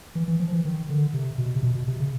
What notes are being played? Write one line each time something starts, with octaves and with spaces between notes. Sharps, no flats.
E3
E3
F3
E3
D#3
D3
C3
B2
C3
B2
B2
C3
C#3